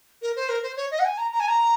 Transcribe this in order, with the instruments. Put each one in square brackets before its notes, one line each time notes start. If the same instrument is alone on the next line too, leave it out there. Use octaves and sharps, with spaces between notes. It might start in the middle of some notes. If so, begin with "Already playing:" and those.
[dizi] A#4
C5
A#4
C5
C#5
D#5
F#5
G#5
A#5
A#5
G#5
A#5